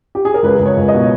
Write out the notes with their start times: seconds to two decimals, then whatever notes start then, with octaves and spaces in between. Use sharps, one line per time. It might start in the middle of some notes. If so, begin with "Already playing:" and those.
0.15 G4
0.25 G#4
0.34 A#4
0.43 C#2 B4
0.60 C#2
0.65 C#5
0.77 C#2
0.88 D#5
0.94 B2